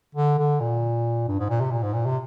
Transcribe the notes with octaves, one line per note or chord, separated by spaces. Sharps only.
D3
D3
A#2
G2
G#2
A#2
C3
A#2
G#2
A#2
C3